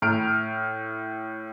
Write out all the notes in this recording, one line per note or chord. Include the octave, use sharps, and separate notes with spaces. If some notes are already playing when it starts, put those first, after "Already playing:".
A2 F6 D7